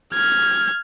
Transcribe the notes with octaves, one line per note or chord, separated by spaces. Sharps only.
F6 G#6